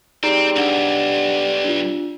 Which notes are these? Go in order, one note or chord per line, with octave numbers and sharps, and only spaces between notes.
G3 C4 D#4 G#4 A#5
B1 D4 F#5
D4 F4